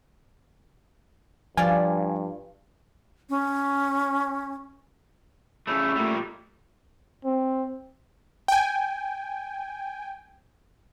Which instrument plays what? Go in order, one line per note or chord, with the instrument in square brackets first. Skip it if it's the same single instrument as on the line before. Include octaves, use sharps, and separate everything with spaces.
[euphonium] G2 [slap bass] F3 [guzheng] F4 D5 [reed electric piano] G#5
[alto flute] C#4
[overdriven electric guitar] C#3 A3 [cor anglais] E4
[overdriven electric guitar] A#2 G3 [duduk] A3
[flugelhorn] C4
[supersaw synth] G5 G#5